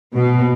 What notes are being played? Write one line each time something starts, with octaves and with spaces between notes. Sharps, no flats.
B2